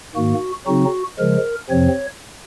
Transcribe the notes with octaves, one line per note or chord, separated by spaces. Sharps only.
G#2 D#3 A#3 F#4
C#3 F#3 C4 D#4 F#4
C#3 F3 G#3 A#4
F2 C3 F3 C4 C#5